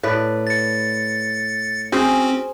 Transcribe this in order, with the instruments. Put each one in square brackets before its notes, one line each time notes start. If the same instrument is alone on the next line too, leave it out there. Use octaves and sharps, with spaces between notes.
[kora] A2 B4 D5
[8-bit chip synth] A6 C#7
[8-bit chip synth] C4 C#4 F#4 [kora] G#4 C5